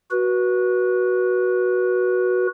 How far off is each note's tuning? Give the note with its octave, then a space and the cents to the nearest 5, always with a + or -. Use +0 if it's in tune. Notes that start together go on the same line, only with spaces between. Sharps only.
F#4 +0 B4 -25